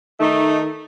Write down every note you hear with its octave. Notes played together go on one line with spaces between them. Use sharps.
D#3 A3 D#4